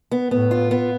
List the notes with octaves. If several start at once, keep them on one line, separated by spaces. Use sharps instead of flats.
B3
A2 B3
F4
B3